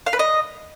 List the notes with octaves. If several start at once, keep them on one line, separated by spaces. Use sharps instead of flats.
F5
B4
D#5